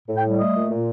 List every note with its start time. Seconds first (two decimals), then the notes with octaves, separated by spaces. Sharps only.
0.08 A2
0.16 G5
0.24 G3
0.39 A3 D#5
0.55 A#2
0.71 A#2